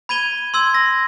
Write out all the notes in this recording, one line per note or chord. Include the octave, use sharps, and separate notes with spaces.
B5 G#6 D#7 G7
C6 E6 G#6
A#6